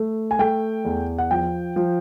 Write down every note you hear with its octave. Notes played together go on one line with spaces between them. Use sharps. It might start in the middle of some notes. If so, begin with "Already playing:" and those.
Already playing: A3
G#5
A3 G5
E2
F#5
F3 G5
F3